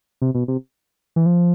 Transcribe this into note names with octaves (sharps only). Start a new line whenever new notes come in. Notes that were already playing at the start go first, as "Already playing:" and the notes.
C3
B2
C3
E3
F3